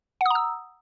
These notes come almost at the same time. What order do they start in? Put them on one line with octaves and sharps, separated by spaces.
F#5 D#6 A#5 E6